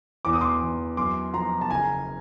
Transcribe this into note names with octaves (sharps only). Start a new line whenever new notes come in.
E2 D6
D#6
C6 D6
E2
F#2 C6 D6
F3 A#5 C6
A5
F#1 G#5 A#5